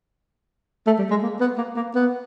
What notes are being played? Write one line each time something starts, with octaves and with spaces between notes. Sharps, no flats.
A3
G3
G#3
A#3
B3
A#3
A#3
B3